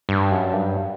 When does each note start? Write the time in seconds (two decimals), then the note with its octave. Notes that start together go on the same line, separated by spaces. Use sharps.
0.09 G2
0.31 F#2
0.53 G2